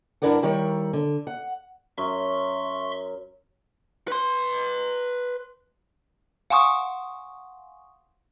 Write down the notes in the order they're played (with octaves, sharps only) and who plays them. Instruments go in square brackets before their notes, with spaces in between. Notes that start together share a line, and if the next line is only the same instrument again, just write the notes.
[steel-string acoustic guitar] G2 D4 E4 A#4 D5 F#5
D#3 G3 E4 A#4 C#5
D3
F#5
[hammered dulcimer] F#2 [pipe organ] E5 C6 C#6
[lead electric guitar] B4 C6
[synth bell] F5 F#5 G#5 C6 C#6 D#6